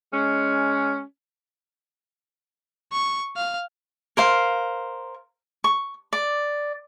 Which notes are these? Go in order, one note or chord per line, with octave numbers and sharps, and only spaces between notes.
G#3 C#4
C#6
F5
A#4 C5 F5
C#6
D5